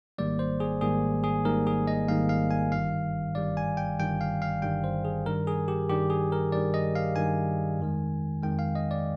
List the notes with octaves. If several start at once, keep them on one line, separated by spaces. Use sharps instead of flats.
G#1 G#2 D#3 G3 A#3 D5
C5
G#4
G#1 G#2 D#3 G3 A#3 G#4
G#4
G#1 G#2 D#3 G3 A#3 A#4
G#4
D#5
G#1 G#2 D#3 G3 A#3 F5
F5
G#5
G1 G2 D#3 G3 F5
G1 G2 D#3 G3 D5
G#5
G5
G1 G2 D#3 G3 G5
F5
F5
G1 G2 D#3 G3 G5
C5
G#4
G2 D#3 G3 A#4
G#4
G4
G2 D#3 G3 G4
G#4
A#4
G2 D#3 G3 D5
D#5
F5
G2 D#3 G3 G#5
F2 D#3 G#3
F2 D#3 G#3 G5
F5
D#5
D5